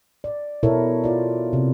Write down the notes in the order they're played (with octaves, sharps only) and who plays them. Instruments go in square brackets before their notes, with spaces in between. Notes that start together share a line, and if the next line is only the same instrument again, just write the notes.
[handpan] D5
B2 E4 A4 A#4 C#5 E5
F4 D5
C3